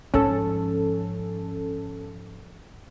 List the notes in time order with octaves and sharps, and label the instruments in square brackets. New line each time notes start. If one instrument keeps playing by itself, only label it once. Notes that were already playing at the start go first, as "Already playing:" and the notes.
[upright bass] G#2 F3 [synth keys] C#4 A4